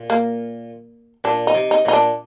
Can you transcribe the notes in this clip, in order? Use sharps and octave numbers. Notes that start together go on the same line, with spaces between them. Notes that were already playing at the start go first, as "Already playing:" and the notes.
Already playing: A#2
A#3
A#2 D4
D#4
C3
D#4
A#2 D#4
D4